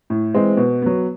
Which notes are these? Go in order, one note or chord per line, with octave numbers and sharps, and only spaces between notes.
A2
E3 G#3 C4
B2
F#3 B3